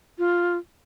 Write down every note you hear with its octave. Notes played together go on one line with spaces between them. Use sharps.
F4